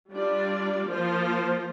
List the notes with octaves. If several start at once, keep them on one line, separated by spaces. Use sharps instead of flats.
G3 D4 F4 D5
F3 A#3 F4 C5